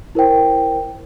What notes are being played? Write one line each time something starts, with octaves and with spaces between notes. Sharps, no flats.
E4 A#4 C5 G5